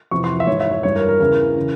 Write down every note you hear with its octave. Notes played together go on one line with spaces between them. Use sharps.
F2 C3 E3 C#6
C6
E5
G#2 C#5
E3
E5
C#5
G2 E3 C#5
A#4
A#4
E2 C#3 E3 A#4
C#3 E3